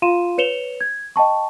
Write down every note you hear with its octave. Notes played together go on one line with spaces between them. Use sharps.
F4 F5 C6 D#7 E7
B4 C#5 C#7 E7 F7 G7
G#6
D#5 G5 A5 C#6